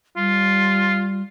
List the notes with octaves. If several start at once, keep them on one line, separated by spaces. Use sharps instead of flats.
G3 F4